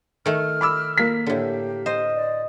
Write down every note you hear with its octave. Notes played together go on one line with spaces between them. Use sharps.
D#3 A3 F6
B5 D6 E6
A#3 B6
A2 D3 G4
C5 D#5
D5